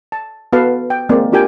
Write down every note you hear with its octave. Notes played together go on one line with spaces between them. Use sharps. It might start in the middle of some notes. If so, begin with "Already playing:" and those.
A5
B3 F#4 A4 B4 F5 A5
G5
G#3 A#3 C4 D5
D4 F4 G4 A#4 G5 G#5